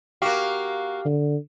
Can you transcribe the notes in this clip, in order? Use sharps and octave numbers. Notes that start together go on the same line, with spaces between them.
A#3 F#4 G4 F5
D3